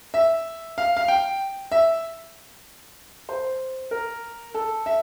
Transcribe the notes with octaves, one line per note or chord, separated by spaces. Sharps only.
E5
F5
F5
G5
E5
C5
A#4
A4
E5